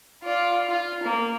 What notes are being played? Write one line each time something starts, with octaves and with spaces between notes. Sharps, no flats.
F4 D5
F4
A#3